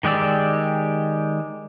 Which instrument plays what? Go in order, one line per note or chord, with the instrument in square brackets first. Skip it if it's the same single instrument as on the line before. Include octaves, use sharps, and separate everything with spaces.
[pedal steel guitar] D#3 G#3 G4 D5 E6